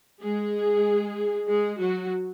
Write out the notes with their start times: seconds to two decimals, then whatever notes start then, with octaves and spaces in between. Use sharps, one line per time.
0.23 G#3 G#4
1.48 G#3 G#4
1.79 F#3 F#4